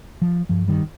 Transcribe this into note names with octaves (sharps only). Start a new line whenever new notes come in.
F3
G2 F3
D#3 G3